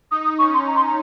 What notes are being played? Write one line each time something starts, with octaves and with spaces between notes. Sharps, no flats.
D#4 D#6
D#6
C#4 C#6
C6
A#5
C6
A#5